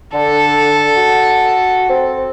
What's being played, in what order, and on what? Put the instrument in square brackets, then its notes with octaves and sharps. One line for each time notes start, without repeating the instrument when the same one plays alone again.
[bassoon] D3 [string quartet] A4
[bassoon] F#4
C4